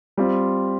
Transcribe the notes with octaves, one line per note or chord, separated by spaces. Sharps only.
G3 C4 F4